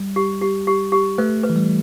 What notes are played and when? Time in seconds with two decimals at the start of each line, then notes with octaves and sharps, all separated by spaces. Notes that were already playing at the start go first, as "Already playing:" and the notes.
Already playing: G3
0.16 G4
0.42 G4
0.67 G4
0.92 G4
1.18 A3 B4
1.43 B4
1.50 E3
1.56 G3